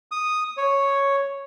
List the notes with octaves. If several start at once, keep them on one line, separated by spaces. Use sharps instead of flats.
D#6
C#5